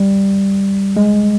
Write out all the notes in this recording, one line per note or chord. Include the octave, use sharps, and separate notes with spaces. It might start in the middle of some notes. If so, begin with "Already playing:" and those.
Already playing: G3
G#3